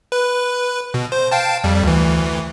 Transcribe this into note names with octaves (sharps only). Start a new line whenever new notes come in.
B4
B2
C5
F5 G5 A5
F2 G3
D2 E3